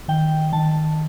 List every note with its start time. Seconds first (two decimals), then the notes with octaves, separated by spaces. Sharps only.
0.08 D#3 G5
0.52 D#3 A5